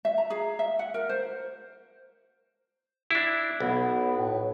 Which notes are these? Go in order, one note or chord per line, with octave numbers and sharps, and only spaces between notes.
E5
A#5
G#4
E5
F#5
A#4
C5
D4 E4
B1 B3
A2